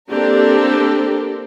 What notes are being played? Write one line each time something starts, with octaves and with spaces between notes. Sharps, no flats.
A#3 C4 D4 G4 A4 A#4